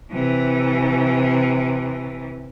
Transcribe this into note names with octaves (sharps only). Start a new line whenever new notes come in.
C3 E3